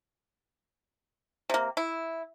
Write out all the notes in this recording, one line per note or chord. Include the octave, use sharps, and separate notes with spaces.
C3 A#3
E4